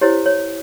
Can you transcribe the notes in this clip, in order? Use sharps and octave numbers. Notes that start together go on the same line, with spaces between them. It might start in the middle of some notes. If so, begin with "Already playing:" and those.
E4 G4 C5 C#5
C#5